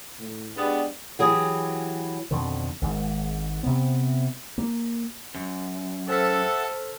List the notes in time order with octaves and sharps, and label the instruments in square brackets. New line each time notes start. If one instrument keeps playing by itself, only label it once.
[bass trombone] A2
[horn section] G3 G#3 B3 [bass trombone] D4
[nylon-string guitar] E3 F#3 G4 G#4
[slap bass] F2 B2 D3 D#3
G#1 G#2
C3 B3
A#3
[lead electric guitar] F#2
[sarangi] A4 [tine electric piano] C5 F6 B6 [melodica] E5 F#5 A5